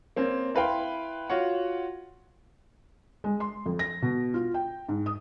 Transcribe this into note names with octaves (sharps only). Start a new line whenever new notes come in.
A#3 C4 C#4
E4 B4 F5 G5 C6
F4 F#4 C#5 F#5
G#3
C6
F2
A#6
B2
F4
G5
G#2
D#6